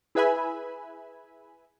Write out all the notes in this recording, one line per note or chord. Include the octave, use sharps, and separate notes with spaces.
E4 G#4 B4 E5 G#5 B5